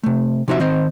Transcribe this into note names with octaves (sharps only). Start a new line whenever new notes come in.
C3 A3
C3 F3 D#4 F#4 G4 E5
D#3 C4 C5 D#5